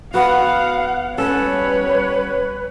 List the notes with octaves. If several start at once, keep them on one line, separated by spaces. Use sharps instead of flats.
B3 F#4 F5 F#5
G3 B3 C#4 A4 B4 C#5